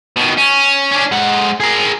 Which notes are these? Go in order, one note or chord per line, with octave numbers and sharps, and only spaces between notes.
B2 D#3
C#4
C#4 D4
G#3 F#5
G#4 A#4